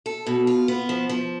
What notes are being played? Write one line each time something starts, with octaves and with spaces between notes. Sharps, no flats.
A4
B2
F4
B3
F3
F3